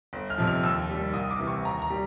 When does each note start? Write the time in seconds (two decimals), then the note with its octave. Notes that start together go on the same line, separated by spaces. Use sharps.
0.13 G1
0.30 F6
0.38 F2 C3 F3
0.47 F6
0.63 D#2 E6
0.89 D#3 G3
1.14 C2 D#6
1.31 D6
1.39 C3 E3
1.48 C#6
1.65 D#2 A#5
1.82 A#5
1.90 D#3 G3